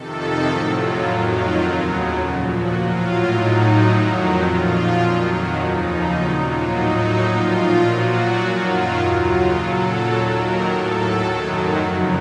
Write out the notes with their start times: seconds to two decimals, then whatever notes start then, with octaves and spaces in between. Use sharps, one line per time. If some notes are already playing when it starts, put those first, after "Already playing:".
Already playing: F2 C3 D#3 A4
0.45 A2 F#3 F4
0.74 F4
1.02 F2 D#3 F#3 F4
1.30 F4
1.58 D#2 C#3 F#3
2.15 A#2 F3 A4
2.43 F#4
2.72 A2 F#3 F4
3.29 A2 F#3 D#4
3.85 F2 D#3 F#3
4.42 A#2 F3 F4
4.99 F2 D#3 F#3
5.55 D#2 C#3 F3 D#4
6.12 A#2 F#3 D#4
6.40 F4
6.69 A2 F#3 D#4
7.25 A#2 F3 F4
7.82 A#2 F#3 F#4
8.38 F#2 D#3 F#3 F4
8.95 D#2 C#3 F#3 F4
9.24 F4
9.52 A#2 F#3 A4
10.08 D#2 D#3 F#3 A#4
10.37 A#4
10.65 A2 F#3 A4
11.22 F#2 D#3 F#3
11.79 F2 C#3 F3 F#4